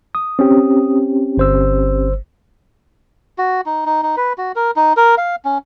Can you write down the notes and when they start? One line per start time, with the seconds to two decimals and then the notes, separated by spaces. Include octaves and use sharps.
0.15 D#6
0.39 C4 C#4 G4
1.38 G1 C5 E6
3.38 F#4
3.66 D#4
3.86 D#4
4.03 D#4
4.17 B4
4.38 F#4
4.56 A#4
4.76 D#4
4.97 A#4
5.18 F5
5.45 C#4